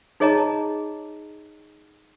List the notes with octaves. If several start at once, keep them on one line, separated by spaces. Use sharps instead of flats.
D#4 G#4 C#5 D#5 A5 A#5